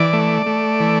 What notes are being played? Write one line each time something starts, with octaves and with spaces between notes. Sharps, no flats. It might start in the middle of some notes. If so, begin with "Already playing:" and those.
Already playing: E3 D5
A3
A3
E3